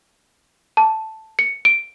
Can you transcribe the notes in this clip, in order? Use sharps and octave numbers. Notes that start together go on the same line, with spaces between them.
A5
C#7
D7